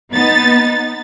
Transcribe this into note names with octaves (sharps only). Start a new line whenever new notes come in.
B3 D#4 A6